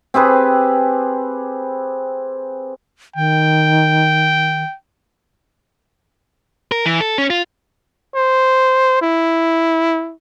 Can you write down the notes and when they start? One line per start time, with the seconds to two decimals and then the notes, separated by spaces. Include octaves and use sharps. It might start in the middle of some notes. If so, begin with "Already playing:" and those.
0.14 C4 G4 G#4 B4
3.16 D#3 G5
6.72 A#4
6.86 E3
7.01 A4
7.18 C#4
7.30 F4
8.15 C5
9.02 E4